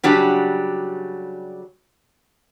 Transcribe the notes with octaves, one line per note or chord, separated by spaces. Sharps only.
C#3 F#3 G3 D4 G4